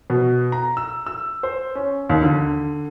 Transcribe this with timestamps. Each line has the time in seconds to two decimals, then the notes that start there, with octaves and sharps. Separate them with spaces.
0.10 B2
0.52 A#5
0.77 E6
1.06 E6
1.43 C5
1.75 C#4
2.09 D#2
2.23 D3